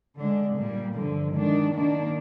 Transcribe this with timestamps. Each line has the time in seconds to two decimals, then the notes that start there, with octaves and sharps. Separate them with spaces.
0.16 D3 G#3 D4
0.56 A#2 G3 A#3
0.95 G2 D3 F3
1.34 D#3 G#3 D4
1.73 D#3 A#3 D4